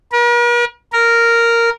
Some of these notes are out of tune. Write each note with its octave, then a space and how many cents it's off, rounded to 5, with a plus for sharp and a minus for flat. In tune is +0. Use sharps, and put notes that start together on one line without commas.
A#4 +45
A#4 -5